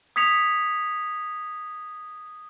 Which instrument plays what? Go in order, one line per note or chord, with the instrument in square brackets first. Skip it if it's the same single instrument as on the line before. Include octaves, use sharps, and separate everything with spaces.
[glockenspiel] D#6 G#6 B6 C#7 F7